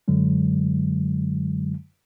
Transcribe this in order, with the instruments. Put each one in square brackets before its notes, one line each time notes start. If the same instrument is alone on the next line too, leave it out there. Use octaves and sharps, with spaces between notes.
[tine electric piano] F#2 D3 F#3 G#3